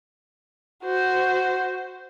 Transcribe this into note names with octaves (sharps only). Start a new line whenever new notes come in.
F#4 C5